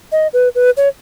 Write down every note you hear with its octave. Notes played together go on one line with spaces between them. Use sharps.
D#5
B4
B4
C#5